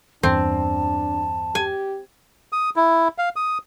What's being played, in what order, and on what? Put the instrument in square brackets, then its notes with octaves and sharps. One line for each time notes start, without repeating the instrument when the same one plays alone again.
[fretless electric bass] E2 G2 E3 [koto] C4 [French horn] D4 [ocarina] A5
[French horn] G4 [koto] G#5
[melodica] D#6
E4
F5
D#6